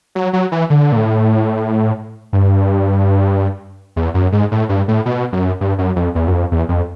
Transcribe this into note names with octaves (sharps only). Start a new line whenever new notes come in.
F#3
F#3
E3
D3
A#2
A2
G2
E2
F#2
G#2
A2
G2
A2
B2
F#2
G2
F#2
F2
E2
F#2
F2
E2
F2